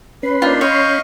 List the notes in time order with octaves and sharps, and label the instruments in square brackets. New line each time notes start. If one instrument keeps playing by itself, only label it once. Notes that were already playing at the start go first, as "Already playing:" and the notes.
[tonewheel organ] C#4 B5 C6 [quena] B4
[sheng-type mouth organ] A#3 D4 D#4 [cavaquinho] F4
[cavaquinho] C#5 [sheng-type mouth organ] D#5 F5 C#6 [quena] G6